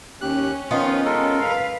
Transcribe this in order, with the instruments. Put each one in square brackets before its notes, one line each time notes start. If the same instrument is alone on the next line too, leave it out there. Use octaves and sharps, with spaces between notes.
[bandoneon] D#2 G4 F#6 [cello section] C#4
[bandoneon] D#3 F3 [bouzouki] B3 D#4 F4
[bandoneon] G#3 A4 A#4
[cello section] B4 F5